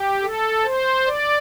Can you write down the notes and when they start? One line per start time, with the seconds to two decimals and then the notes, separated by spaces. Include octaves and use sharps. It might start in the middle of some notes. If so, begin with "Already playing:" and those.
Already playing: G4
0.22 A4
0.64 C5
1.06 D5